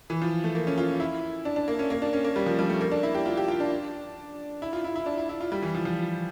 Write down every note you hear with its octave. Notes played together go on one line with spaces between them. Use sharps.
E3
F3
A3
A#3
C#4
F4
E4
D4
D4
A#3
C#4
A#3
D4
C#4
A#3
G3
F3
G3
A3
A#3
D4
E4
G4
F4
G4
F4
D4
E4
F4
E4
E4
D4
E4
E4
F4
G3
E3
F3
F3